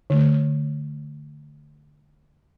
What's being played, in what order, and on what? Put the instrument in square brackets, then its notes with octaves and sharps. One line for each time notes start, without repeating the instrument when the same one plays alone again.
[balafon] D3 A3